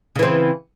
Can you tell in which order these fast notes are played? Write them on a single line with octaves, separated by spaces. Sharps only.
C#3 E3 C4